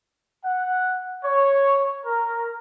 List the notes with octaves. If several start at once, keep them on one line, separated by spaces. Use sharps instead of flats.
F#5
C#5
A#4